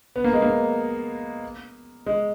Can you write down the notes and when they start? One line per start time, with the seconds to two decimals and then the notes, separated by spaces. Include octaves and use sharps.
0.16 B3
0.24 A#3
0.33 G#3
0.42 A#3
2.06 G#3